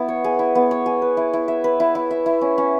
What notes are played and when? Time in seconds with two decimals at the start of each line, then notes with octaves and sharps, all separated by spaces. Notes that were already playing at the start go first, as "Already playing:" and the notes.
Already playing: B3 E4
0.08 C#5
0.24 G#4
0.39 E4
0.55 B3
0.71 C#5
0.86 G#4
1.02 B4
1.17 E4
1.33 E4
1.48 E5
1.64 B4
1.80 E4
1.95 E4
2.11 E5
2.26 E4
2.41 C#4
2.58 C#4